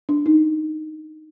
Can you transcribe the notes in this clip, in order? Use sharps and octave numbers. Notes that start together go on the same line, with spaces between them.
D4
D#4